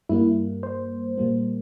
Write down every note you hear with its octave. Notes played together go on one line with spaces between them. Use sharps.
G2 G3 A#3 E4
C5
A#2 G3 A#3